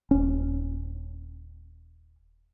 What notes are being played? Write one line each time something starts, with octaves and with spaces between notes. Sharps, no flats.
D#1 C#4